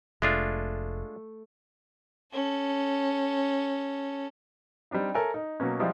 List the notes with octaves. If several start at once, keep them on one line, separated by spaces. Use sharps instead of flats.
F1 G#3 A3 D4 F4
C#4 A4
G3 C4 D4 D#4
A4 A#4 C#5 E5 G#5
D#4
B2 F#3 A#3 C#4
F3 G3 G#3 E4 F4 C5